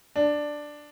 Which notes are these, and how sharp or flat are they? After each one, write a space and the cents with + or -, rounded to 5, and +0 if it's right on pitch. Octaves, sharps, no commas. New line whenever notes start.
D4 +5